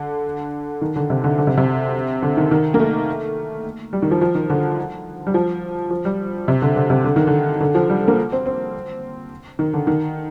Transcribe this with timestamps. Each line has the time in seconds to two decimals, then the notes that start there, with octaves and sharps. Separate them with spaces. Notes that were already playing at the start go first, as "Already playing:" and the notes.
Already playing: D3
0.81 D#3
0.96 D3
1.10 C3
1.24 D3
1.38 D3
1.47 C3
1.57 C3
2.22 D3
2.37 D#3
2.51 D#3
2.74 A#3
2.80 A3
3.93 G3
4.02 D#3
4.11 F3
4.21 F3
4.35 D#3
4.50 D3
5.27 G3
5.34 F3
5.90 F3
6.05 G3
6.48 C3
6.62 D3
6.76 D3
6.90 C3
7.04 D3
7.16 D#3
7.27 D3
7.60 D3
7.75 F3
7.90 G3
8.08 A#3
8.32 C4
8.46 C4
9.59 D#3
9.73 D3
9.87 D#3